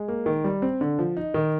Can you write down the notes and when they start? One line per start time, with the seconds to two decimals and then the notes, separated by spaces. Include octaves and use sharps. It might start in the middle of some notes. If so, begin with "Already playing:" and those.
Already playing: G#3
0.08 A#3
0.26 D#3
0.44 G3
0.62 C4
0.81 D3
0.99 F3
1.17 D#4
1.34 D#3